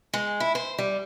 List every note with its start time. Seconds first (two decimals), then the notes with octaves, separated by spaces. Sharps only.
0.14 G#3
0.40 E4
0.55 C5
0.78 G3